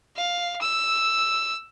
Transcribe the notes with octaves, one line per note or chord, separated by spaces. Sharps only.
F5
E6